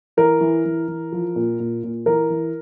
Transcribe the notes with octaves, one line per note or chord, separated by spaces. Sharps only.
E3 A#4
E3
E3
E3
F3
A#2
A#2
A#2
E3 A#4
E3